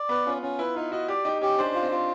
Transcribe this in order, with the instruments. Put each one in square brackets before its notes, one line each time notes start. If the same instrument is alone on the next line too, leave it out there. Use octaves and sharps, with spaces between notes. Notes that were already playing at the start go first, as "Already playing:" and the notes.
Already playing: [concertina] D5
[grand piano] B3 [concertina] B4
[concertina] C#4 [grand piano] F4
[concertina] C#4 [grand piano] F4
[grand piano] E4 [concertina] B4
[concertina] D#4 [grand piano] F4
[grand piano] F#4 [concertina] D#5
[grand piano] G4 [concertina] D5
[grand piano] D#4 [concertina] G4
[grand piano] C#4 [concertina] G4
[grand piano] D4 [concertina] C5
[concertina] F4
[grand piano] C4
[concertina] F4